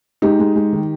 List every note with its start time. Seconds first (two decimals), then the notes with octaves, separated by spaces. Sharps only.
0.22 G#3 D#4 G4
0.39 G#3
0.55 G#3
0.73 D#3